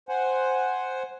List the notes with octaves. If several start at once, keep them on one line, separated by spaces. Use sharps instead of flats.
C5 F#5 G#5